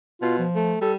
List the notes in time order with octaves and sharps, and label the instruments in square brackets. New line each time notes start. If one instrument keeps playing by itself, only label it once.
[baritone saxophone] B2 [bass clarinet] F4
[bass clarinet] F3
[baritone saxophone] A3
[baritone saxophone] G3 [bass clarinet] A4